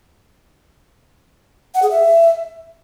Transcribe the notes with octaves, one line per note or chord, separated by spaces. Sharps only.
F#5
G#4
E5